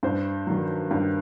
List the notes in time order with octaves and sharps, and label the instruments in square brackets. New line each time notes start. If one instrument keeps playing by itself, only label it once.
[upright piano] G2 C5
D#3 F#3
G2